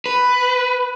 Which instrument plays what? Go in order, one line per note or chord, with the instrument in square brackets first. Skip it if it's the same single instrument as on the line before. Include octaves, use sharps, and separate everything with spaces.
[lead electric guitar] B4